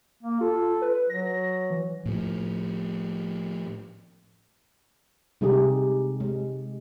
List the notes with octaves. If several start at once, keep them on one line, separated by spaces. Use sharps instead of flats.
A#3
F4 A4
B4
F#3 A#6
E3
A2 F3
C3 G3 G#3 D#4 G4 G#4
G#3